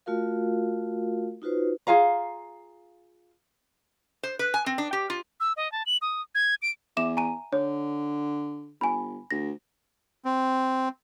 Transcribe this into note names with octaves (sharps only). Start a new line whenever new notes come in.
A3 F4 F#4 A#4 F5
D#4 F4 F#4 B4 C5
F4 G#4 F5 A#5
C5
B4
G#5
C4
D4
G4
F4
E6
D#5
A5
F#7
D#6
G#6
D7
E2 E5 D6 E7
G#5 A#5 D#7
D3 C#5
G1 G#5 B5
D2 A#6
C4